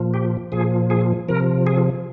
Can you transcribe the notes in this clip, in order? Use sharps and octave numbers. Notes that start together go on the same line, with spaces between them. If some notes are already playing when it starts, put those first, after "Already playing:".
Already playing: A#2 F3
G4
A#2 F3 G#4
G#4
C3 F3 A#4
G#4